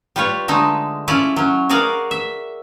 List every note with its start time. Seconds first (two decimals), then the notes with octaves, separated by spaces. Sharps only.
0.16 G3 F4 B4 C#5
0.48 D3 G#3 A3 D#4
1.08 C#4 E4 F4 D5
1.36 F#3 C#4
1.69 F#4 G#4 A#4 D5 F5
2.11 E5